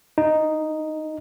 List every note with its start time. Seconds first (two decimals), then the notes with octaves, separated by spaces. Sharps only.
0.18 D#4